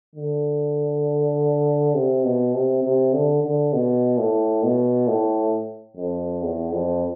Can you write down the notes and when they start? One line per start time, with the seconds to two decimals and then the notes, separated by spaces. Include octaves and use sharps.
0.15 D3
1.95 C3
2.24 B2
2.54 C3
2.84 C3
3.14 D3
3.43 D3
3.73 B2
4.18 A2
4.63 B2
5.08 A2
5.97 F2
6.42 E2
6.72 F2